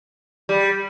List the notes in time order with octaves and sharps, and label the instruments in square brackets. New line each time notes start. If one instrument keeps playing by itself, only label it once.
[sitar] G3